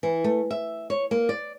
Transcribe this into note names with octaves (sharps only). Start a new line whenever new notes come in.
E3
A3
E5
C#5
A#3
D5